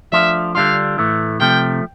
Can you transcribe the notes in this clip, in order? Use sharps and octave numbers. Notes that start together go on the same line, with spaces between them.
F3 A3 D4 F4 E5
D3 G3 D4 F4 F5
A2 E3 A3
C3 F3 A3 G5